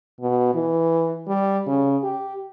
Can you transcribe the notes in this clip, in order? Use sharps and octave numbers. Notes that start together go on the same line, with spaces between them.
B2
E3
G3
C#3
G4